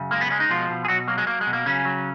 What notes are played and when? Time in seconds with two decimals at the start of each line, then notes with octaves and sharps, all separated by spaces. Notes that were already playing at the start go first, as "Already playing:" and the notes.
Already playing: F#2 C#3
0.11 G#3 A#3
0.21 B3
0.30 G#3 C#4
0.40 D#4
0.50 B2 F3 F4
0.70 B2
0.85 G#4
0.88 B2 F#3 F#4
1.08 F#3 A#3
1.18 G#3
1.27 F#3 A#3
1.41 G#3
1.47 B2
1.53 A#3
1.66 C#3 F#3 C#4
1.85 F#3